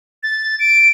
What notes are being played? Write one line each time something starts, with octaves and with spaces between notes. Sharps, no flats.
A6
D7